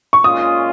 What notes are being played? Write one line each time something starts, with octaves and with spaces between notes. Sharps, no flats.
C#6
A#2 G#3 C#4 F4 D#6